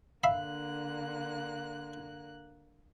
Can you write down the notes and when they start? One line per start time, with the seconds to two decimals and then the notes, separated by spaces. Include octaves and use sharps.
0.24 D3 A#3 E5 F5 B5 F#6